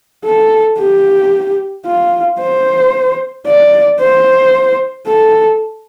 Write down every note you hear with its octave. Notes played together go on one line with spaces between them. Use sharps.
A4
G4
F4
C5
D5
C5
A4